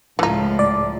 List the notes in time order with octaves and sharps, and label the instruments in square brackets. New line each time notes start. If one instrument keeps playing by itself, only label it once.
[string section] C#2 A2 [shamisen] E3 D#4 [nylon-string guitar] F3
[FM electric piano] D5